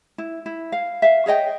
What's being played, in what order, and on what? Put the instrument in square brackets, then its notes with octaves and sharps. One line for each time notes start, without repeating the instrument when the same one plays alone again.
[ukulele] E4
E4
F5
E5 F5
G#4 C#5 D#5 G5